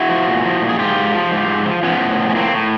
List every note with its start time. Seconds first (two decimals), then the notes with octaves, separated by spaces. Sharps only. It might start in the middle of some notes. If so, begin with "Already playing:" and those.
Already playing: E4 F#4
0.09 F3
0.27 A#2
0.44 F3
0.62 A#2
0.69 G#4
0.79 G#2 F4 G4
0.96 G#2
1.14 F3
1.32 G#2
1.48 G#2
1.66 F3
1.83 F3 B3 C#4
2.00 A2
2.18 F3
2.30 C#4
2.35 A2 A#3 C4
2.53 A2